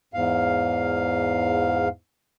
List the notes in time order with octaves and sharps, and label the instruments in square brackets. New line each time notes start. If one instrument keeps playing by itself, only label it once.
[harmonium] E2 G#2 F5